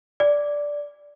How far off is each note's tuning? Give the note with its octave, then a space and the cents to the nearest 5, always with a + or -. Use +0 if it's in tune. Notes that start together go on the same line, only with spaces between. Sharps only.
D5 -5